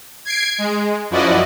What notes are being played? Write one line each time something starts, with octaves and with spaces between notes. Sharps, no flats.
G#6 C7 D7
G#3
F#2 F3 E4 F#4 D5 D#5